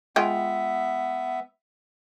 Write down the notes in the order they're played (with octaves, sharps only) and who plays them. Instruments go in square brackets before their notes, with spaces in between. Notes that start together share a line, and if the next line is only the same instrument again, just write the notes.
[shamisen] G#3 F4 G5 [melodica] B3 E5